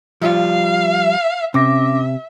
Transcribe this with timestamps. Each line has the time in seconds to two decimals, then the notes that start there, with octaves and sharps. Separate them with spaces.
0.21 F3 G3 F4 F5
1.54 C3 C#4 E5 D6 A#6